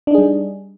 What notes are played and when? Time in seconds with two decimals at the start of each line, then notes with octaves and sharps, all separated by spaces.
0.07 D4
0.11 D#4
0.14 G#4
0.18 G3